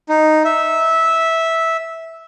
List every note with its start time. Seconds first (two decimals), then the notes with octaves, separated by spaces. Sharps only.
0.09 D#4
0.45 E5